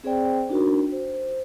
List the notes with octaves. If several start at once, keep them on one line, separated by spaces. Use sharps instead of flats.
C4 G#4 C5 D5 G5
D4 D#4 F#4 A#4
C5